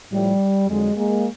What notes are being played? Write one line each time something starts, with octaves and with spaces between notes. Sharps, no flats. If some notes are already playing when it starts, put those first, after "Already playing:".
A2 F3 G3
F2 D3 F#3 G#3
G#3 A#3